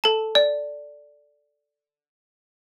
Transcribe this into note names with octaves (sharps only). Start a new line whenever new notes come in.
A4 A5
D5